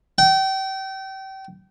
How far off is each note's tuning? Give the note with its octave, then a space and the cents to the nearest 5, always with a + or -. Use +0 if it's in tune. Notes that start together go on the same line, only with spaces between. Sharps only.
G5 -30